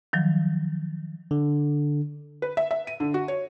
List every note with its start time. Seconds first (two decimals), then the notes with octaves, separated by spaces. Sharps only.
0.13 D#3 F3 F#3
1.31 D3
2.42 B4
2.57 E5
2.71 E5
2.87 D#7
3.00 D3
3.14 F#4
3.28 C#5